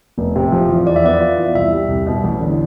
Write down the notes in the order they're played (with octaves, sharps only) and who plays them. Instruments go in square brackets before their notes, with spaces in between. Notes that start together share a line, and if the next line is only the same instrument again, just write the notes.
[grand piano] F1
C3
F3
E2
[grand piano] F2 [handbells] D5
[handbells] E5
[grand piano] B3 [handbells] D5
[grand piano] F4
E3
[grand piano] C2 [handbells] E5
[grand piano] G3
C2
B2
A1
D3